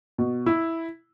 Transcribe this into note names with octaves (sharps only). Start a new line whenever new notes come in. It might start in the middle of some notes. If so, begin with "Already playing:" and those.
B2
E4